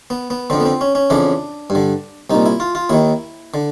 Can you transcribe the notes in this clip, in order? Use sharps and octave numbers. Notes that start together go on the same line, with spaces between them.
B3
B3
F2 D3 C4
B3
C4
C#4
C#4
F2 C#3 E3 D4
G2
D3
C2 A#2 D#4
E4
F4
F4
D#2 D#3 E4
D3